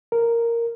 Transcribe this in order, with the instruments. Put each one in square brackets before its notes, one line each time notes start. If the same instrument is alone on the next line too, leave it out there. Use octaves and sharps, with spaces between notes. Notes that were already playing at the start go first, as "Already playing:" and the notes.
[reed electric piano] A#4